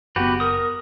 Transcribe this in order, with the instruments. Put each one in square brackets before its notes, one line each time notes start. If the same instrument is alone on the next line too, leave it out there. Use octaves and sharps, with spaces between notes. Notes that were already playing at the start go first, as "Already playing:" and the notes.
[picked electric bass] F#1 B3 [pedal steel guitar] F#4 G4 B4
[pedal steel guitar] A#4 D#6